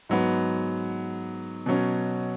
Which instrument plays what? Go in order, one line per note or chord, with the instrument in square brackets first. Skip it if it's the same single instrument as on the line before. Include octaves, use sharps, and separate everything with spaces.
[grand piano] G#2 F#3 B3
B2 F#3 C#4